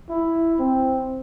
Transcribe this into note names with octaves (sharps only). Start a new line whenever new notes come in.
E4
C4